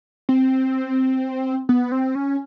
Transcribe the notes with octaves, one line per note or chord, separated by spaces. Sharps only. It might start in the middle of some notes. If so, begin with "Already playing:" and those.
C4
B3
C4
C#4